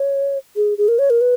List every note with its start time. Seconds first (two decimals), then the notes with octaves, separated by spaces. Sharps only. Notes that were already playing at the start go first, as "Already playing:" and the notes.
Already playing: C#5
0.56 G#4
0.78 G#4
0.88 A#4
0.99 C#5
1.10 A#4
1.21 B4